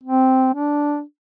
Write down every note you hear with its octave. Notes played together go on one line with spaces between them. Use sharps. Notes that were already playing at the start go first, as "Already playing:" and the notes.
C4
D4